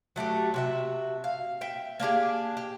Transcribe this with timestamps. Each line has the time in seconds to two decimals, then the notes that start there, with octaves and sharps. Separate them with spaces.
0.16 F#3 A3 E4 G4
0.54 C3 F#4 E5
1.24 F5
1.61 E5 G5
2.00 A#3 D4 G4 G#4
2.57 G4